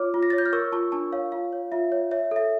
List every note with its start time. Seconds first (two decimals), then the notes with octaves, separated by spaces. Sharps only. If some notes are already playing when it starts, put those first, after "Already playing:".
Already playing: F4 C#5 D6 F6
0.14 F4
0.23 A#6
0.30 A6
0.33 C#5
0.38 G6
0.46 F6
0.53 A#4 C#6 E6
0.72 F4 A5 C#6
0.92 D4 A5 C#6
1.13 C#5 F5
1.32 F4 F5
1.52 C#5
1.72 F4 E5
1.92 C#5
2.11 C#5 E5
2.31 A4 E5